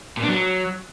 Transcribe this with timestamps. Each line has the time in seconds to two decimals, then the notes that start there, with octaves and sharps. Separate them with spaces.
0.17 A#2
0.23 D4
0.28 F#3